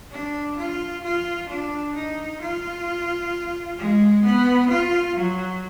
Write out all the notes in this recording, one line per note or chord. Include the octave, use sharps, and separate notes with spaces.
D4
F4
F4
D4
D#4
F4
G#3
B3
F4
F#3